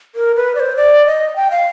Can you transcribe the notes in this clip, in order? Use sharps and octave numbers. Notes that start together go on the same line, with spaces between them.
A#4
B4
D5
C5
D5
D#5
G5
F5